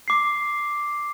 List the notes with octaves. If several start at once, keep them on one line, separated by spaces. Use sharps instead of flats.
D6 C7